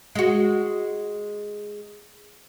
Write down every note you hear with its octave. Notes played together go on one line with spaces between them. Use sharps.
G#3 F#4